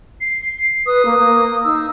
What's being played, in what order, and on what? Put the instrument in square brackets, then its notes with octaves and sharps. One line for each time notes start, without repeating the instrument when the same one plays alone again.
[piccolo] C7
[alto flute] B4 [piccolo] D#6
[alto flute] A#3
A#3
[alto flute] D#4 [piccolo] E6